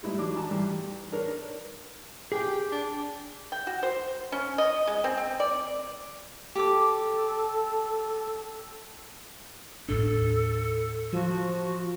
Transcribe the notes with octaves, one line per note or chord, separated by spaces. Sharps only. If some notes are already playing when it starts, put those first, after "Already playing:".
G3 G#3 D#4 E4 G4
E3 F#3 D4 D6
A5 A#5
G2 E3 G3
D4 A#4 C#5
G4 G#4 G5
D4
G5
F#4
C5
C#4
D#5
G#3
C4
C4
D5
G4 A4 D6
D#2 A2 D4 A4
F3 F#4